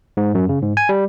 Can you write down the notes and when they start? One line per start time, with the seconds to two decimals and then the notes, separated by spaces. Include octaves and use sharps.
0.17 G#2
0.35 F#2
0.49 C#3
0.62 G#2
0.77 G#5
0.89 G3